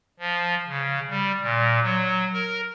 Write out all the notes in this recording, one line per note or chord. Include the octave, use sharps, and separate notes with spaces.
F3
C#3
G3
A#2
F#3
A#4